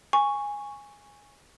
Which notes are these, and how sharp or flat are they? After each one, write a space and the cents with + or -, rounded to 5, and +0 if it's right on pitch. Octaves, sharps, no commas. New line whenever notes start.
G#5 -10 C#6 +0